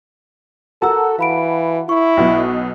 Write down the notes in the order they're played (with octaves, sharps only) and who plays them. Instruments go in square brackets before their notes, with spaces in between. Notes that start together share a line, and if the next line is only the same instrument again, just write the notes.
[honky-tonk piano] F#4 A5 [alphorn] A4 [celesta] A#4 A#5 E6
[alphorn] E3 [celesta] F5 B5 D7
[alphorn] E4 [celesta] C#6
[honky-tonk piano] B1 B2